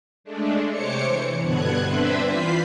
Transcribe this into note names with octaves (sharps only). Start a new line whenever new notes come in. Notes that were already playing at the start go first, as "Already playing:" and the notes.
G#3 A3 D4
C3 C5 C#5 D6 C#7
E3
G2 B2 D3 B3 F#6 G#6
C4 D4 B4 C5 E5 B5
E3 F4 B5 B6 C7